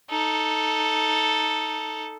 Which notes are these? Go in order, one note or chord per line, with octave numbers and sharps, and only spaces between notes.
D#4 A4